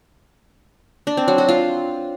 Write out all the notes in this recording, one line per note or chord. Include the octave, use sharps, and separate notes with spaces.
D4
C4
F#3
F#4
F4